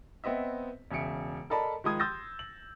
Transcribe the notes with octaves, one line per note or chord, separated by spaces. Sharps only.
B3 C4 D#5 E5
E1 C#3 E5 G#5 C#7 D7
A4 A#4 D5 D#5 A5 B5
D#3 F3 G#3 B5 D#6 G#6
C6 D#6 E6 G6 A6 A#6
F#7